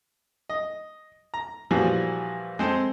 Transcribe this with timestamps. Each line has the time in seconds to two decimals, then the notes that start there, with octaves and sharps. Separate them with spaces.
0.49 D#5
1.34 A#5
1.71 A#2 E3 F3 G3 F#4
2.59 G#3 C4 A4 C5